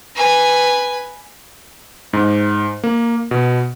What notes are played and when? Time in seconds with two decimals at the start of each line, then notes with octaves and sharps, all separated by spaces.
0.15 B4 G#5
2.13 G#2
2.84 A#3
3.31 B2